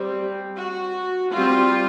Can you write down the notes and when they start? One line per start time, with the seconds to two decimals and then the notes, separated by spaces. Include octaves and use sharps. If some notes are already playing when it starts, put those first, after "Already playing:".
Already playing: G3 C4
0.57 F#4
1.32 G3 C4 F4